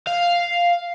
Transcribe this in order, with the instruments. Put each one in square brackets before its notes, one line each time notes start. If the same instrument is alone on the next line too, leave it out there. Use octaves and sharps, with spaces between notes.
[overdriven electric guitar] F5